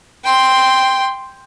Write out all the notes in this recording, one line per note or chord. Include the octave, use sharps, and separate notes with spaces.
G5 C6